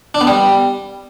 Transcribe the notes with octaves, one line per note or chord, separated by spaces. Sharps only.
D4
B3
G3